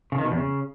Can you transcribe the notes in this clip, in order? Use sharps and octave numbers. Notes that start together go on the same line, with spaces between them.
C#3
D#3
B2
E2
C#3